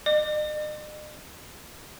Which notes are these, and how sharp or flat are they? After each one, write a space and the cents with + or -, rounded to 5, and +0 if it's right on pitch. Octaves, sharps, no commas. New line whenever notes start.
D#5 -45